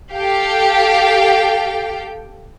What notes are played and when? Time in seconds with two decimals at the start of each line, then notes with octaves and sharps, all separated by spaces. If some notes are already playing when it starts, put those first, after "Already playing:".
0.13 G4 A4 F5 G5